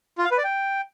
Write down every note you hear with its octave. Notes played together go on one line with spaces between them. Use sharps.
F4
F5
B4
D5
G5